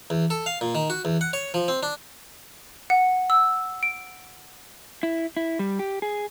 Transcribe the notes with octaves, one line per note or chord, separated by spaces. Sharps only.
E2
A4
F5
A#2
D#3
F#4
E2
F#5
C#5
F3
C4
D4
F#5
E6
D7
E4
E4
G3
G4
G#4